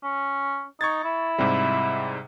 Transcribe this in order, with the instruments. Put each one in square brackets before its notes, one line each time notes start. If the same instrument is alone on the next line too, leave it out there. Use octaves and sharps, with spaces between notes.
[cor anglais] C#4
[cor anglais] D#4 [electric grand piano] C#6 G#6 A6
[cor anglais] E4
[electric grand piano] G#2 C3 G3